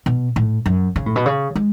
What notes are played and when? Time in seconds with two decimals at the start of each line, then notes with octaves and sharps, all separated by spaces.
0.06 B2
0.36 A2
0.66 F#2
0.96 C#3
1.06 A2
1.16 B2
1.26 C#3
1.56 G#3